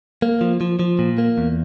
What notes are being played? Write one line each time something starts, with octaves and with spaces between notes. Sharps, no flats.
A#3
F3
F3
F3
A#2
A#3
E2